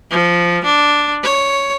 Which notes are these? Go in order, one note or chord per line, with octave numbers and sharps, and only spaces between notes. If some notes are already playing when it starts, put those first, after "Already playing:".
F3
D4
C#5